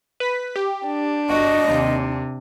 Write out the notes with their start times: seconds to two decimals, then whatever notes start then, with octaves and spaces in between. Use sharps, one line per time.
0.20 B4 B6
0.56 G4
0.86 D4
1.29 G1 F#4 D#5
1.69 D#2 C3